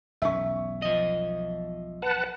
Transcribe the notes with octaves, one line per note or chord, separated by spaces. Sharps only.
E1 B1 C#4 E5 C#6
F3 D#5
B4 F#5 A5